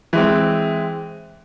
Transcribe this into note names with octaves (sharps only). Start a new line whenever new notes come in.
E3 G#3 C4